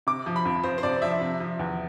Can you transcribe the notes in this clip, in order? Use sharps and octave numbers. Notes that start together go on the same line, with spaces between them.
C3 D6
F3
B5
F2
F2 C5
C5
C3 D5
F3 E5
C3
F3
E2